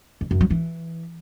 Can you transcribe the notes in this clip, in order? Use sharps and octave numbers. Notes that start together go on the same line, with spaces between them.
F2
F#2
F#3
E3